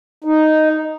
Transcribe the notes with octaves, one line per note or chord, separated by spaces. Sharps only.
D#4